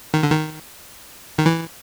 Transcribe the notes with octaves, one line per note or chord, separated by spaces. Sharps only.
D#3
D3
D#3
D#3
E3